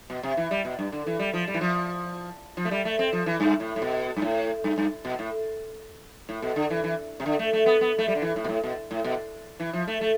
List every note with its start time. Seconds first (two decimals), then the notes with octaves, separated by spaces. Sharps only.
0.10 B2
0.23 C3
0.37 E3
0.51 G3
0.65 B2
0.79 G2
0.92 D3
1.06 E3
1.19 G3
1.33 F3
1.47 G3
1.54 E3
1.61 F3
2.57 F3
2.65 A3
2.71 G3
2.85 A3
2.99 C4
3.13 F3
3.26 E3
3.40 G2
3.60 A2
3.76 A2
3.82 B2
4.16 G2
4.22 A2
4.64 G2
4.78 G2
5.05 B2
5.19 A2
6.29 A2
6.42 B2
6.56 D3
6.70 E3
6.84 E3
7.20 C3
7.26 D3
7.39 A3
7.53 A3
7.66 B3
7.81 B3
7.98 A3
8.08 G3
8.15 D3
8.22 E3
8.36 A2
8.44 B2
8.49 A2
8.63 B2
8.91 A2
9.04 B2
9.60 E3
9.73 F3
9.88 A3
10.01 A3